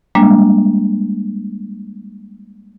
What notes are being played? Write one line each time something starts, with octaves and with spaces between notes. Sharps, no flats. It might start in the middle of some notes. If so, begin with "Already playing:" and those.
G3 G#3 A#3 D4